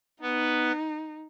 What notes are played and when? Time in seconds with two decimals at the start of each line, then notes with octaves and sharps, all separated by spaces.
0.21 B3 D#4 B4